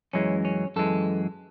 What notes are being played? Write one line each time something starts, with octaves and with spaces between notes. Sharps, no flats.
F#2 E3 G#3 C#4
C#4
F#2 E3 G#3 A4